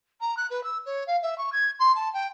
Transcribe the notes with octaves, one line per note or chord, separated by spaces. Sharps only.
A#5
F#6
B4
E6
C#5
F5
E5
C#6
G#6
C6
A5
G5